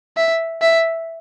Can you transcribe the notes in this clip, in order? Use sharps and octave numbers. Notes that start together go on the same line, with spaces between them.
E5
E5